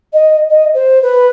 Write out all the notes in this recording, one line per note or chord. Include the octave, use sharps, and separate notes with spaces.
D#5
D#5
C5
B4